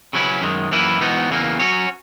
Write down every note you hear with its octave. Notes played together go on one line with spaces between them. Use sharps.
C#3 F#3 C#4 E4 B4
F#2 D#3 G#3
F#2 E3 A#3 E4 B4
G#2 E3 B3 D#4 F#4
E2 C#3 E3 A#3
F#3 C#4 F#4 C#5